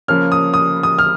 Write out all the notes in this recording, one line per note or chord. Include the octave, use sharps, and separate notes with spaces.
C#3 F3 A#3 C#4 F6
D#6
D#6
D#6
F6